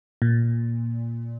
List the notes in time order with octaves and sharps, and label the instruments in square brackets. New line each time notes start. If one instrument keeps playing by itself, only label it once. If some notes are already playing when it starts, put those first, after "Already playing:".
[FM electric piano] A#2